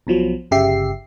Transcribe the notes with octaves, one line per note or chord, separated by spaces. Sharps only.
B1 B2 F3 F#3
G1 C#3 G4 E5 C7